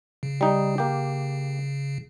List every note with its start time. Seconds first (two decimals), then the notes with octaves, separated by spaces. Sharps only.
0.23 C#3
0.41 G3 D#4
0.78 A#3 G4